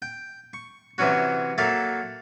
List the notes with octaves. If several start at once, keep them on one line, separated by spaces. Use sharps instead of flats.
G5
C#6
C3 E3 F#3 C#4 F#4
F#3 A#3 A4 E5 F5